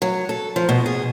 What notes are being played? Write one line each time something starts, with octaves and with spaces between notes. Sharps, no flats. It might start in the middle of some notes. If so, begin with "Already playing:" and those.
F#3
A4
F3
B2
G#4